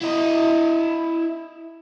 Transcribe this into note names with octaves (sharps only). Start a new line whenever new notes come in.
E4 D#5